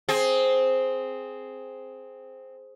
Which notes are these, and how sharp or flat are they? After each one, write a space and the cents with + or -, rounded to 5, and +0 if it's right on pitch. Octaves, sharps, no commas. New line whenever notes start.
C4 +0 G#4 +10